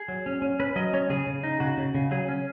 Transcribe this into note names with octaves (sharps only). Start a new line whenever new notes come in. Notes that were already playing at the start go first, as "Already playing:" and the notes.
Already playing: G#4
F#3
C#4
C#4
C#4 B4
F#3 D#5
C#4 C#5
C#3 G#4
C#3
D#4
C#3 F#4
C#3
C#3
F#3 G#4
C#4